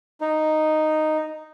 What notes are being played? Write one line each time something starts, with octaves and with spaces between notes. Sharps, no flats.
D#4